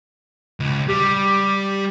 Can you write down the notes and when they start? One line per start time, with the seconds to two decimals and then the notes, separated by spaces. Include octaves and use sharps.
0.60 C#2
0.89 G3 G4